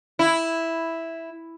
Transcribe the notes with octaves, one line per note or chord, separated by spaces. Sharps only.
E4